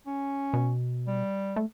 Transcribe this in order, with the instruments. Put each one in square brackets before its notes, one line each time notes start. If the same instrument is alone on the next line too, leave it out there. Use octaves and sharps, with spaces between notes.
[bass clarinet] C#4
[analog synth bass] B2
[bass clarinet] G3
[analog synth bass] A3